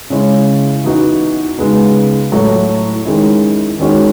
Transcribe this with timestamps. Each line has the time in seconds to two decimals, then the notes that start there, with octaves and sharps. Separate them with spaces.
0.10 C#3 G#3 C#4 E4
0.84 E3 B3 D#4 F#4
1.58 C#3 G#3 B3 D#4
2.31 A2 F#3 A3 E4
3.05 D#3 G#3 C#4 E4
3.79 D#3 G#3 C#4 F#4